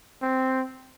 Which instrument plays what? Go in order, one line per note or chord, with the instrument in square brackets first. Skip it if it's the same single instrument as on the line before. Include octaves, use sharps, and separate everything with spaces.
[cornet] C4